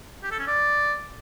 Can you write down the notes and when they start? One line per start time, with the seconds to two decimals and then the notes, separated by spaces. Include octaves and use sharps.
0.23 G4
0.31 A4
0.39 C#4
0.47 D5